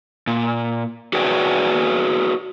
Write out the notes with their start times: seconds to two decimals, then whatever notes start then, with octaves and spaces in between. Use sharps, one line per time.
0.27 A#2
1.13 F#4 G#4 B4 C#5 D5 G5